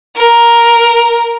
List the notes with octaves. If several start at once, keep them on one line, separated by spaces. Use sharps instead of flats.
A#4